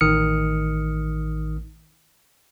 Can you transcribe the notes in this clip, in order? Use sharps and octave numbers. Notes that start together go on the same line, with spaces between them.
A1 D#3 D#6 F6 C#7